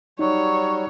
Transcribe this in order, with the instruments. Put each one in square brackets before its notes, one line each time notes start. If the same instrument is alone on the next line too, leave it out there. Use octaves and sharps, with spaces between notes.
[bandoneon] F#3 G3 [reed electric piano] D#4 [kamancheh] C#5